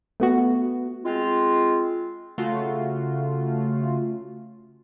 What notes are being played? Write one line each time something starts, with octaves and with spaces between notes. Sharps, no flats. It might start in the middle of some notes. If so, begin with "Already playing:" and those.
A3 B3 F#4
G#3 C4 F4
C#3 A3 F4 F#4